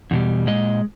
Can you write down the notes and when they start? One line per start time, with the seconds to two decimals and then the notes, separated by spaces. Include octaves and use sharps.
0.11 E2 B2 G3
0.47 A#2 G#3 D#5